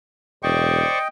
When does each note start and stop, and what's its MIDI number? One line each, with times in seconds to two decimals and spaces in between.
0.43 0.83 28
0.43 0.98 72
0.43 0.98 74
0.43 1.08 75
0.43 1.08 79
0.43 0.98 85